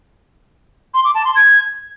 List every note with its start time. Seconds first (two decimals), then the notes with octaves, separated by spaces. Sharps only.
0.94 C6
1.04 D6
1.15 A5
1.25 C6
1.35 G#6